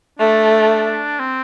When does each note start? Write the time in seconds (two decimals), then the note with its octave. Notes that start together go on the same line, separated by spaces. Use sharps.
0.19 A3 D4
1.19 C4